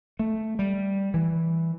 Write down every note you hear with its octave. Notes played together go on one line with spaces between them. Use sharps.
A3
G3
E3